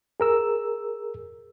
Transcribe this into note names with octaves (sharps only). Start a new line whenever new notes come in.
G#4 A#4 E6